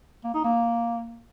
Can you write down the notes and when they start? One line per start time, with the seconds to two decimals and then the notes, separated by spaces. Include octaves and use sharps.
0.24 A#3
0.34 D#4
0.44 A#3